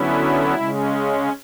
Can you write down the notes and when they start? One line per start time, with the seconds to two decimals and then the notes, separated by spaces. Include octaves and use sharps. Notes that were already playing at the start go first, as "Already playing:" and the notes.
Already playing: D3 F#3 B3 C#4 E4
0.54 C#3 G#3 C#4